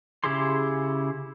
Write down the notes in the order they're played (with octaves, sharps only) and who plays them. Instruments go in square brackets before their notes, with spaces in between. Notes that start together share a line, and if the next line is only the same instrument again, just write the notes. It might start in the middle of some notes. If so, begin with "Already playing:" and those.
[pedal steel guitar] C#3 E4 G4 G#4 C6